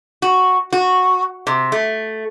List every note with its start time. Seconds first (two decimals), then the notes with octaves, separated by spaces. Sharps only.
0.22 F#4
0.73 F#4
1.47 C3
1.72 A3